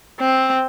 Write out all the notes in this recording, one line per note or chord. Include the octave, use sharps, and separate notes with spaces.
C4